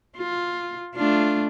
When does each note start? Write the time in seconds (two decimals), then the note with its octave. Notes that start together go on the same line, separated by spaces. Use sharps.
0.17 F4
0.95 A3 D4 F4